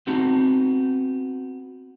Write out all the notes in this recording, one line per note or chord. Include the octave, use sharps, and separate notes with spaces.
B3 C4 D#4 F#4